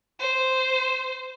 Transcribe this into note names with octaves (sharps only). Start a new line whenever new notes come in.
C5